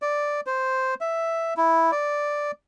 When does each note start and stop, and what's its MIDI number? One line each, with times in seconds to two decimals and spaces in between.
0.02 0.41 74
0.46 0.94 72
1.01 1.54 76
1.57 1.91 64
1.92 2.51 74